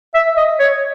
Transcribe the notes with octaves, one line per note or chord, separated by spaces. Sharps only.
E5
D#5
C#5